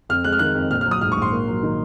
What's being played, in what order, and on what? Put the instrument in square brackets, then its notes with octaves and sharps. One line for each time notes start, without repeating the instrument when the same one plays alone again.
[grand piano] F2 F6
G#3 F#6
F6
D#3 F#6
F2
A#1 F6
F6
F#3
D#6
G#2 F6
C#6
A#1 C6
A#3
F#3
D#3